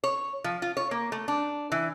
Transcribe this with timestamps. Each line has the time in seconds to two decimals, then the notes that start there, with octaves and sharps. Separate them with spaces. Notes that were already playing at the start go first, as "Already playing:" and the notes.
0.04 C#5
0.44 F3
0.62 F4
0.77 C#5
0.91 A#3
1.12 A3
1.28 D4
1.72 E3